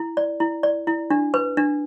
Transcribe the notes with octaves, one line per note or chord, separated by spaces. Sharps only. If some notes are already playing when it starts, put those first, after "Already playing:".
Already playing: E4
D5
E4
D5
E4
D4
B4
D4